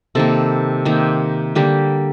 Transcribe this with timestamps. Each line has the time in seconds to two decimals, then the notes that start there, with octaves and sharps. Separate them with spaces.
0.15 C3 D#3 A#3 A4
0.85 C3 D#3 A#3
1.55 D3 G3 A#3 G4